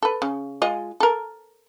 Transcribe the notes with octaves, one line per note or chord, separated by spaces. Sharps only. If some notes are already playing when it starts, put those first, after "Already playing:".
A4 B4
C#3
G#3 F4 D#5
A4 A#4